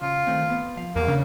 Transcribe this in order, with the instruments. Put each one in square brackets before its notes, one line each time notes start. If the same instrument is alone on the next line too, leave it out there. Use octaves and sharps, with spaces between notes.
[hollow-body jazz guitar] C#3 [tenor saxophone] F4
[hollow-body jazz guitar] D#3 A3 C4
B3
F3 F5
[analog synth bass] E2 [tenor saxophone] A#3
[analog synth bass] C#3 [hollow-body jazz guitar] D4